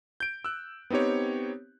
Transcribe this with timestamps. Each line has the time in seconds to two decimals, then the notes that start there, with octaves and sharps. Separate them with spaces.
0.20 G6 D7
0.45 E6 F#6
0.90 B3 C4 D#4 G4 C#5